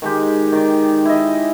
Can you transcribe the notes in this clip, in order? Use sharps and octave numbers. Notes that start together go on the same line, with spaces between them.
D#3 G#3 G4
D#3 D5
E4 D#5